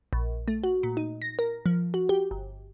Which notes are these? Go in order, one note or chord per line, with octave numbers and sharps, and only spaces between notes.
A#1
A3
F#4
A#2
D#4
A#6
A#4
F3
F#4
G4
G1